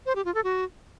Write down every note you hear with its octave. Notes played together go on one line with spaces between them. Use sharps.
C5
G4
F4
A4
F#4